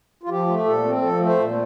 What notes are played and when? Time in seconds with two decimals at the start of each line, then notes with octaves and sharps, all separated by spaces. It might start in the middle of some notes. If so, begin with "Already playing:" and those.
0.23 F4
0.29 F3 G4
0.47 A3
0.65 A#2 A4
0.83 C4
1.02 F3 A4
1.20 A3
1.26 C5
1.38 A#2